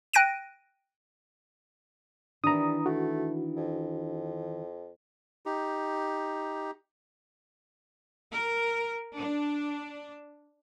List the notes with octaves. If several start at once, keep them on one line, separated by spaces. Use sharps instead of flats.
G5 F#6 A#6 D7 D#7
D#3 E3 G3 D4 E4 A#5 D#6
A3 F#4
F2
D#4 G4
A#4
D4